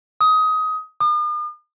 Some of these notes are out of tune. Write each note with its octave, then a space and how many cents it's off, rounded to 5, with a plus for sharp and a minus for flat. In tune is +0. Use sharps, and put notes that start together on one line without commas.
D#6 +20
D#6 -45